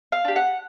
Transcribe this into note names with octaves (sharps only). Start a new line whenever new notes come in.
F5
D4 G4
F#5